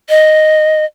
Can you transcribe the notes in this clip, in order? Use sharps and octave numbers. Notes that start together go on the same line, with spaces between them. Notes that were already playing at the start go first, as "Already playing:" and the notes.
D#5